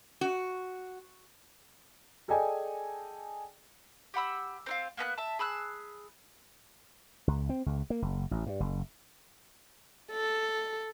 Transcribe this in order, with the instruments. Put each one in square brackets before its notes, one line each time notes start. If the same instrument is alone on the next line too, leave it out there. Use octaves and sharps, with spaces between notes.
[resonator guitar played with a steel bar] F#4
[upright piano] G#4 A4 D5 D#5 G5 G#5
[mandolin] G4 F#5 B5 E6
C4 D#4 F4
A#3 B3 A#5 F#6
E5 A5
G#4 B5 E6 F#6
[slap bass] C#2
C4
C#2
A#3
F#1
A1
G2
F#1
[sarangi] A4